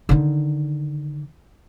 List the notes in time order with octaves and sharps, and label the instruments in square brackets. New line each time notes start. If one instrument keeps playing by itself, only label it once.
[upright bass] D3 D#3